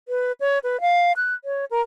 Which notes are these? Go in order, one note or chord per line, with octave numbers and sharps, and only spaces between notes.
B4
C#5
B4
F5
F#6
C#5
A#4